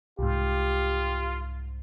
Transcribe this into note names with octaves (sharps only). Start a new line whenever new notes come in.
C2 G#2 F4 G4